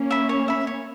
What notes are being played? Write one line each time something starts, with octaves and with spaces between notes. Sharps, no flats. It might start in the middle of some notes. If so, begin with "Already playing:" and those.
Already playing: A#3 C#4
E5 B5
C#5
E5 B5
C#5